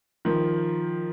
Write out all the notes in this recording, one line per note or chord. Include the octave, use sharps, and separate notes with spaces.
D#3 F3